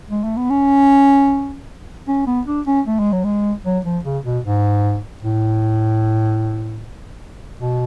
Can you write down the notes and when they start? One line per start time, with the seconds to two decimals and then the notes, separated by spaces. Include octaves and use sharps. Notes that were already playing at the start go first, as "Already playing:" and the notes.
0.10 G#3
0.24 A3
0.37 B3
0.50 C#4
2.08 C#4
2.27 B3
2.47 D4
2.67 C#4
2.87 A3
2.99 G#3
3.13 F#3
3.24 G#3
3.65 F#3
3.85 F3
4.05 C#3
4.25 B2
4.44 G#2
5.23 A2
7.60 B2